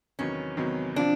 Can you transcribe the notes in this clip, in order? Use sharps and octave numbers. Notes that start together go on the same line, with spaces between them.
E2 C3 D#3 F#3 B3 C#4
E2 C3 D#3 F#3 B3
C3 F3 D4